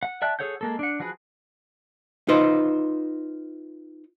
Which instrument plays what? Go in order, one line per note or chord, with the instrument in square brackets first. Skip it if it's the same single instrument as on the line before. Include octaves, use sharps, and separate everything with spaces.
[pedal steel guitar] F#5
D5 E5 G5 A5 F#6
G#4 A4 C#5 F#5 G6
G#3 A#3 A4
D4 F#5
F3 F#4 G#4 B4
[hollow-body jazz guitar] D#4 F4 B4 C5